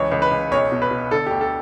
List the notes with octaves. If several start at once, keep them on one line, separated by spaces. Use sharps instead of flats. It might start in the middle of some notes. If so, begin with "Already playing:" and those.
Already playing: C#2 E3 C#5
C#2
B4
C#2
B1 C#5
B2
B4
B2
D3 A4
D2 G4
A4